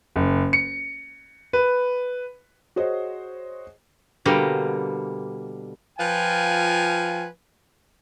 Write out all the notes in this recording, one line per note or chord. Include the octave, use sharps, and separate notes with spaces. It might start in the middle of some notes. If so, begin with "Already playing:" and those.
F#1
C#7
B4
F#4 G#4 C5 C#5 D#5
B2 D3 G3 A#3
F3 F4 B4 G5 G#5